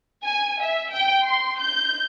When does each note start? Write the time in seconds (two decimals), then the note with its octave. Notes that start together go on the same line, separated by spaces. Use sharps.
0.24 G#5
0.61 E5
0.91 G5
1.24 C6
1.61 G6